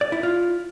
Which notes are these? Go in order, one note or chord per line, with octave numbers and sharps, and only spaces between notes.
D5
E4
F4